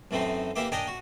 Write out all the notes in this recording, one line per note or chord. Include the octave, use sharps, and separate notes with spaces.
F#2 E3 A3 C4 D#4
E3 A#3 G4 E5 D6
D4 A#4 D5 D#5 G5 G#5
F#4